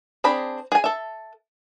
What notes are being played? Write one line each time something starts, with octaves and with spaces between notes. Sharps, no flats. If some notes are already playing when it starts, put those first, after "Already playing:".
C4 D4 G#4 B5
G#4 G#5
A4 E5